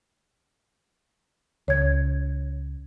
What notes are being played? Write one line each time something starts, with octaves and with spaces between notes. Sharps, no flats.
C#2 C#5 G#6